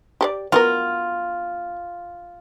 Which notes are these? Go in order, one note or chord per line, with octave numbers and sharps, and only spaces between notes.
G4 A4 D5
F#3 B3 F4 A#4